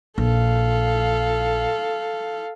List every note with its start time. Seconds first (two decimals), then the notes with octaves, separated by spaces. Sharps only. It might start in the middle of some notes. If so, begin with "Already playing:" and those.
0.18 A#1 A4 F5